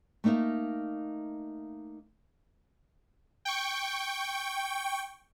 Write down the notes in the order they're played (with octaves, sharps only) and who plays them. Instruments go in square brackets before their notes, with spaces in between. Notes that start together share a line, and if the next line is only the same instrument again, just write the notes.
[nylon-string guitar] A3 A#3 D#4 E5 F5
[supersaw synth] G5 C#6